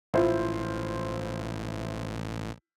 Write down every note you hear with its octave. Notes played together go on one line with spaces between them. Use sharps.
A1 E4 F4 C5